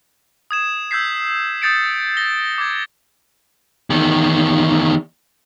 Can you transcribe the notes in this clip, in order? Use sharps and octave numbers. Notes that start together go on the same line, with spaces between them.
D#6 G#6 E7
E6 G6 G#6 B6 C7
D#6 G6 A6 C#7 D7
A#6 G7
D6 G#6
E2 D#3